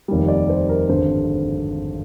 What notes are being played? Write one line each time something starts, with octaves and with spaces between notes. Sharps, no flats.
F1 D#2 D#3 G3
D5
C5
A#4
G#1 G2 D3 C5